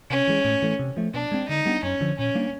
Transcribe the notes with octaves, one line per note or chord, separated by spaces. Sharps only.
C3 C#4
E3 G#3
A2
E3 A3
C3
F3 A3
B2 D4
G#3 C4
D3 D#4
G3 B3 D4
F#2 C#4
D3 F3
A#2 C#4
G3 A#3 D4